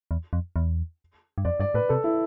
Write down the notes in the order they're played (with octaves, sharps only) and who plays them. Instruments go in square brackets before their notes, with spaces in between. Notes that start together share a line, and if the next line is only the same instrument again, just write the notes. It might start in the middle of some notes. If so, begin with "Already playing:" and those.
[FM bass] E2
F2
E2
G2
[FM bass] F2 [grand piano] D5
[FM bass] G2 [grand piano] D5
[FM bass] A2 [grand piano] B4
[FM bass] C3 [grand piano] A4
[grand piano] E4